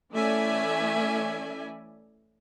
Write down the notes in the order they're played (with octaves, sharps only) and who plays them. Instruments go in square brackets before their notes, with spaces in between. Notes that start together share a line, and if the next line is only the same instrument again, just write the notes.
[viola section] E3 A3 C#4 D5 E5 G#5